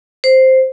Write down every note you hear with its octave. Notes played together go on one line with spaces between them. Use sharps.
C5